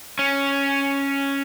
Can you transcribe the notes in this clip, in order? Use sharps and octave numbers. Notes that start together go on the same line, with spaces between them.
C#4